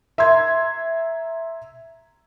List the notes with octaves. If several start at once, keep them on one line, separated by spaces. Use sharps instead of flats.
E5 A#5 C6 G#6